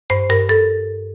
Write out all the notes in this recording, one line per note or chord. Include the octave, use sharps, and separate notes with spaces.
G2 C5
G2 A#4
G2 A4